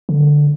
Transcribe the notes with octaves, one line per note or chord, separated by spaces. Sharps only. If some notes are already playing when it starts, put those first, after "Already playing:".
D3